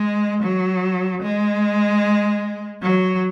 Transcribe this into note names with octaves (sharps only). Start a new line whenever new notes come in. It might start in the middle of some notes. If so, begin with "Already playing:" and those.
Already playing: G#3
F#3
G#3
F#3